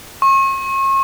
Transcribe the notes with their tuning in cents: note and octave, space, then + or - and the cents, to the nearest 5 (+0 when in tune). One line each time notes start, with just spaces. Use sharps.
C#6 -40